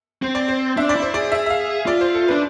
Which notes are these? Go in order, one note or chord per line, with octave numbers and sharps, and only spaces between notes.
C4 C5
D5
C5
D4 E5
D5
E4
C5
G#4 D5
G#4 E5
E5
F5
F4 D5
C5
A4
D4 B4